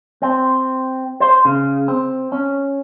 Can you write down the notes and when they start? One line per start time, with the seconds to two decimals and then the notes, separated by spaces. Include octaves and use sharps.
0.22 C4
1.20 C5
1.45 C#3
1.88 C4
2.32 C#4